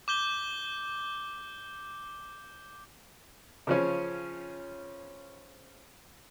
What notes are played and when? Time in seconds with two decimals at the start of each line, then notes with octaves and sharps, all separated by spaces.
0.08 D6 G6 G7
3.67 C#3 F3 C#4